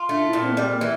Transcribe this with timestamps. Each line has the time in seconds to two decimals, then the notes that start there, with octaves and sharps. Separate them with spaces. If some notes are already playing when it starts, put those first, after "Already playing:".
Already playing: F4
0.09 A3 D4
0.26 E4
0.33 A#2
0.42 C4
0.51 A#3
0.57 G3 C4
0.74 A#3
0.81 E3